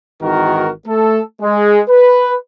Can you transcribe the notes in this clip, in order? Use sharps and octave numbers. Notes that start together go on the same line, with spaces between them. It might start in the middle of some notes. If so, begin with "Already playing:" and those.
G#1 D#3 E3 F#4 A#4
A3 A4
G#3
B4